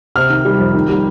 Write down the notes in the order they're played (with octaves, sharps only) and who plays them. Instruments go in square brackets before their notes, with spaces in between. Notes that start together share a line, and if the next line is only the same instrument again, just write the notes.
[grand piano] C3 F6
D#3
G3
F2
D#3
G3